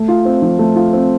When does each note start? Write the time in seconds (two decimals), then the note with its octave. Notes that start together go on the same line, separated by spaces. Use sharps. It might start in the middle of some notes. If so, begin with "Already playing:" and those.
Already playing: A3
0.08 F4
0.25 C4
0.42 F3
0.59 A3
0.76 F4
0.93 C4